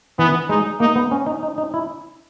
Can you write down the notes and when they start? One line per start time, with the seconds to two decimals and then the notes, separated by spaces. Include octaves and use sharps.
0.19 E3 B3
0.49 G#3 D#4
0.80 A#3 D#4
0.96 B3
1.11 C#4
1.26 D#4
1.43 D#4
1.58 D#4
1.74 E4